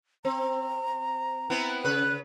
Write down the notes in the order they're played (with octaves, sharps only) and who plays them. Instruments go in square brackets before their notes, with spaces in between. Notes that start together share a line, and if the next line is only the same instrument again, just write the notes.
[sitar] C4 [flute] A#5
[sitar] B3 C4 E4
[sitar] C#3 B4 [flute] F#6